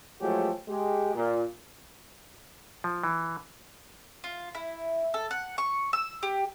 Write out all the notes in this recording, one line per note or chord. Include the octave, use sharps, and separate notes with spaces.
F3 F#3 G#3 A3 G4 G#4
G#3 G4
A#2
F3
E3
F4
E4
A4
F#5
C#6
E6
G4